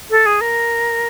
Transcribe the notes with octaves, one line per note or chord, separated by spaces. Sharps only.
A4
G#4
A#4